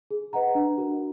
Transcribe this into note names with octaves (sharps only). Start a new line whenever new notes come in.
G#4
B4 D#5 F#5 A#5
D4
F#4 A#4